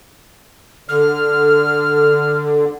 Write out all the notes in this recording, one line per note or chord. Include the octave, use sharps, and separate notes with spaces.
D3 F6